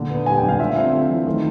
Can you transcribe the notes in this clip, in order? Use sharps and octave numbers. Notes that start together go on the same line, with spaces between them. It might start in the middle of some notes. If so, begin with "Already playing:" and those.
Already playing: A#2 D3
B3
G3 G#5
G5
D3
F5
F4 E5
C4 F5
A3
E3
D#3